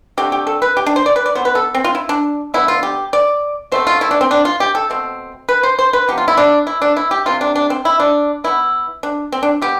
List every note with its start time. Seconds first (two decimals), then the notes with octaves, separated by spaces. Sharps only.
0.17 D3 A3 C4 G4
0.32 G4
0.47 A4
0.62 B4
0.77 G4
0.86 D4
0.96 C5
1.06 D5
1.16 B4
1.26 D5
1.35 E3 B3 C5
1.45 B4
1.55 A4
1.75 C4
1.84 F4
1.95 E4
2.09 D4
2.54 D3 F3 B3 E4
2.68 F4
2.83 G4
3.13 D5
3.72 B2 A3 C4 C5
3.87 F4
4.01 E4
4.11 D4
4.21 C4
4.31 D4
4.45 F4
4.60 G4
4.75 A4
4.90 B2 A3 C4
5.49 B4
5.63 C5
5.79 C5
5.93 B4
6.08 C3 F3 B3 G4
6.18 F4
6.28 E4
6.37 D4
6.67 E4
6.82 D4
6.96 E4
7.11 G4
7.26 C3 E3 G3 C4 F4
7.41 D4
7.55 D4
7.70 C4
7.85 E4
8.00 D4
8.44 E3 B3 E4
9.03 D4
9.32 C4
9.43 D4
9.61 E3 G3 B3 G4